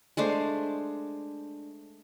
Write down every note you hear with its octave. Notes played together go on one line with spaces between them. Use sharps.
G#3 A3 D4 C5